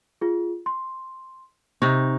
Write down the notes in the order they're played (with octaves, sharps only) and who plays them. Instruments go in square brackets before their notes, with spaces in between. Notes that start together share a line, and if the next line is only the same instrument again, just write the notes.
[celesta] F4 G#4
C6
[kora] C3 D#4 [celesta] C#6